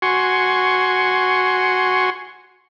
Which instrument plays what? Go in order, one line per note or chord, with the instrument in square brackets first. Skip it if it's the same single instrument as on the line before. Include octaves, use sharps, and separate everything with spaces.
[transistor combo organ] F#4 G#5 C6 C#6